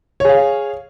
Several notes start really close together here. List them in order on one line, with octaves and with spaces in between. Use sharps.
C#5 G#4 F5